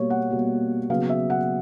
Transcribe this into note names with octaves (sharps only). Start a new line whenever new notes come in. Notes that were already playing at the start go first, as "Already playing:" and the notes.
Already playing: B2 G3 A#3 C#5
F#5
B2 G3 A#3
C#3 F#3 B3 F5
E5
F#5